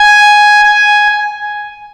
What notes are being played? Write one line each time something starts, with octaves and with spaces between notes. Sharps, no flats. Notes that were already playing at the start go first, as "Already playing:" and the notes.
Already playing: G#5
G#5